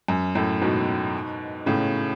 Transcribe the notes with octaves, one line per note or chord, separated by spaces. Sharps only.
F#2
F#2 A2
G#2 B2
A2 C#3